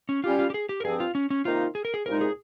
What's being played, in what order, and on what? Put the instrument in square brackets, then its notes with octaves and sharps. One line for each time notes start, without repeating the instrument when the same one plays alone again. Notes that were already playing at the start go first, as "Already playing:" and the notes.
[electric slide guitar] C#4
[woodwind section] G3 C#4 G4 [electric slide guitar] F4
[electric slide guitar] F4
G4
G#4
G4
A#4
[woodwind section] G2 F3 C4 [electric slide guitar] G#4
[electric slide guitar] F4
C#4
C#4
[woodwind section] C3 D#3 A#3 D#4 [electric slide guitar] F4
[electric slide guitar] G#4
A#4
G#4
[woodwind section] C2 A#2 G#3 D#4 [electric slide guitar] A#4
[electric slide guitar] G#4